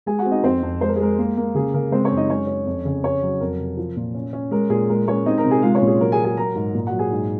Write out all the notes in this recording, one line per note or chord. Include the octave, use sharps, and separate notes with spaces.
G#3 G#4 G#5
F#4 F#5
C4
D#4 D#5
F2 C4 C5
F2
G#3 C5
A#4
G#4
G#3 A#4
A#3
A#3
C#3 G#4
C#3 A#4
G#3 C4 C5
C#4 C#5
F#2
D#4 D#5
G#3 C#4 C#5
C#4
F2
C#3
C#4 C#5
F#3
F2 A#4
C3
F3
A#2
C#4
C#4
G#3 A#4
A#2 G#4
G#3 A#4
G#3 C#4 C#5
C4 D#4 D#5
A#4 A#5
C3
G#4 G#5
G#3 F4 F5
C#4 C#5
A#2
G#4
F#3 A#4
G#4 G#5
F#3
G#4 G#5
F#3 A#4 A#5
G#2
A#2
F#4 F#5
F#3
G#4 G#5
G#2